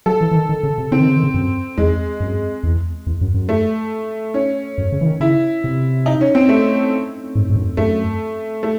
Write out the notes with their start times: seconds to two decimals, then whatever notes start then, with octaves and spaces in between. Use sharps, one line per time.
0.06 F#3 A4
0.21 E3
0.31 E3
0.35 D#3
0.49 D#3
0.63 C#3
0.78 C3
0.91 C#3 C4
1.00 D#3
1.08 C#3
1.16 D#3
1.23 C#3
1.34 F#2
1.77 E2 G#3
2.20 F#2
2.63 E2
3.07 E2
3.21 F#2
3.34 F#2
3.49 A3
4.34 C#4
4.78 F#2
4.92 C#3
5.01 E3
5.06 D#3
5.20 C#3 E4
5.64 C3
6.06 D#4
6.21 C#4
6.35 C4
6.49 A3
7.35 G#2
7.50 G#2
7.56 F#2
7.77 F#2 A3
8.63 A3